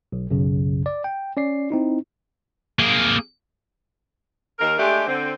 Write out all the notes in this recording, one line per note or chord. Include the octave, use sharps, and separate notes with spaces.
B1
B1 F#2 C#3
D5
G5
C#4 D5 C7
C4 D#4 E4
A#3 G#4
D#2 D#3 A#4
G#3 A3 D4 G4
D3 C4